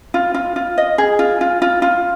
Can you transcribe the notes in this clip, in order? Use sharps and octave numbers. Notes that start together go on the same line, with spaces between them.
F4
F4
F4
D#5
G#4
F4
F4
F4
F4